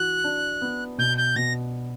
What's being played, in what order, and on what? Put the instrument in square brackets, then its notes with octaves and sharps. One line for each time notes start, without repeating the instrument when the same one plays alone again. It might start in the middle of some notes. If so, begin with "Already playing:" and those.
Already playing: [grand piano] E3 F#4 [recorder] F#6
[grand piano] D4
B3
[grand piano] B2 [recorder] G6
[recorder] G6
[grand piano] B2 [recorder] A#6